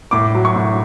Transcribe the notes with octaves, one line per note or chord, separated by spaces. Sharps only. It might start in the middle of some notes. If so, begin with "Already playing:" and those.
A2 D6
F#3
C#6
A2